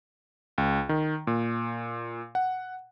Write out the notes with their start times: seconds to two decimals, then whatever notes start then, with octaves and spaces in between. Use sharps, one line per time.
0.58 C#2
0.89 D#3
1.27 A#2
2.35 F#5